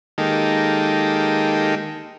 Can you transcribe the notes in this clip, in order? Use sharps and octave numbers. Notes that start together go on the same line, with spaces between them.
D#3 G#3 A#3 D#4 G4 A4